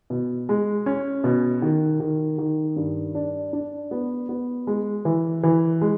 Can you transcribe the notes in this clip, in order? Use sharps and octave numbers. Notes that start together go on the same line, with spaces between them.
B2
G#3
C#4
B2
D#3
D#3
D#3
G2
D4
D4
B3
B3
G#3
E3
E3
G#3